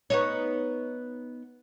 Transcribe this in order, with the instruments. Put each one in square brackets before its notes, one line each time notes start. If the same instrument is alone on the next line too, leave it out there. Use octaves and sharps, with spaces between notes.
[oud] B3 D#4 C#5